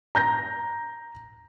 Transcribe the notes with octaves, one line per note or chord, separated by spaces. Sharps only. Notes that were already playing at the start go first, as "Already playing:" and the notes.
A#5 G6 A#6